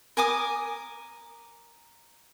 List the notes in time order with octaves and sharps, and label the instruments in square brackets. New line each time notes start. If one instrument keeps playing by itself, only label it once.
[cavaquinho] A#4 G#5 D6 D#6